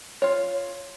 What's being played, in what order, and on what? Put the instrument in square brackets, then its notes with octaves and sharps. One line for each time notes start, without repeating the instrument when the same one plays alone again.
[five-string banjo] F4 C#5